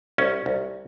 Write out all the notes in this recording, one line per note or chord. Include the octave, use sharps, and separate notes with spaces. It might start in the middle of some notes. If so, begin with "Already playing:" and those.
C2 C#4
C2